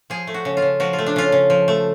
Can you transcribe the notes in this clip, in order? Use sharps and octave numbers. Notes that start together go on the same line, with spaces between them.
F3 G#4
A3
F#4
C#3
F4
C#3
F3 F#4
F4
A3
D4
C#3 F4
C#3
F3
A3